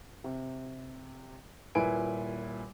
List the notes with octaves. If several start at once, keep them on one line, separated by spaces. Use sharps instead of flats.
C3
D#1 A#2 E4 B4 G#5 D7